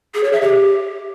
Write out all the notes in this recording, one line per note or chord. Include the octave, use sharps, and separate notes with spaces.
G#4
C#5
E5
G4